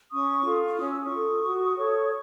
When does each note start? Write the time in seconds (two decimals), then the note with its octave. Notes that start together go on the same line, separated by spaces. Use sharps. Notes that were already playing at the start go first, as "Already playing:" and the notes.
0.11 C#4 C#6 D#6
0.45 F4 A4
0.78 C#4 D#6
0.90 E6
1.02 C#6 D#6
1.10 F4 A4
1.44 F#4
1.78 A4 C#5